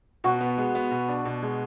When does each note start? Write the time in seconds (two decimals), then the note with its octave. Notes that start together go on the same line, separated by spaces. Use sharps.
0.24 B2 F#4
0.41 B3
0.58 G#3
0.75 B3
0.91 B2
1.08 D4
1.25 B2
1.43 G#3